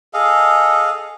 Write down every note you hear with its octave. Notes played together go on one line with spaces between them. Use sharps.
G#4 A4 D#5 F5